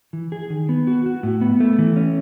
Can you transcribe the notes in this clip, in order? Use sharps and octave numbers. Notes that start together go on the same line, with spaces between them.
E3
G#4
D#3
B3
F#4
F#4
A2
B3
A3
E3
C#4